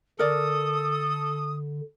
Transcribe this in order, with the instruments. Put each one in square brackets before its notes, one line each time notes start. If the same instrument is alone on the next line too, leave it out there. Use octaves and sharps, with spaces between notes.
[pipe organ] D3 [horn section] A4 [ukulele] A#4 D5 [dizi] D#6